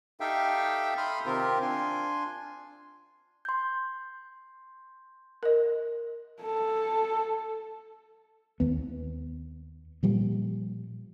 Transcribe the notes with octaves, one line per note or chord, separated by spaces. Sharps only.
D#4 G4 A4 E5 F5 G5
B5 C6 D#6 F6 G6
C3 D#3 C4 F4 G4 A#4
D4 F4 G#5 C6
C6 G6
A#4 D#5
A4
D#2 B3
A#2 F3 G3